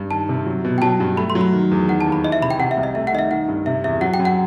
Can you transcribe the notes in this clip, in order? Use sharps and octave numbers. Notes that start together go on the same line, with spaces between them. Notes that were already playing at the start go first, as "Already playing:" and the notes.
Already playing: G2
D#3 A5
C3
F#3
B2
G5
F#3 A5
G2
A3 B5
C6
F#3
B5
D#3
E2
D#3 F#5
A5
D#2
B5
E3 D#5
E5
C3 B5
G5
C3 F#5
E5
C2
D#5
A3 E5
F#5
D#3 D#5
E5
D#3 F#5
G2
C3 E5
E2 E5
F#3 F#5
G5
F#2
F#5